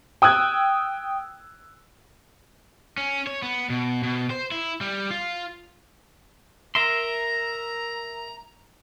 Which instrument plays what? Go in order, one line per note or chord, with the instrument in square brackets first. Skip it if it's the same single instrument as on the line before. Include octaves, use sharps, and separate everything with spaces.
[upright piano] G5 D#6 E6 F#6 G#6
[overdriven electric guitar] C#4
C#5
B3
B2
B2
C5
E4
G3
F4
[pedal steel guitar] A#4 E5 C6 [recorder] A#5